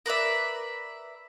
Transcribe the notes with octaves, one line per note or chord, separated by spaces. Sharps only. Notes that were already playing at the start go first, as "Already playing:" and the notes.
A#4 B4 D5 E5